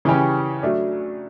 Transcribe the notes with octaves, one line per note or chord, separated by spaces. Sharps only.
C#3 E3 G3 C#4 G4
F#3 A3 D4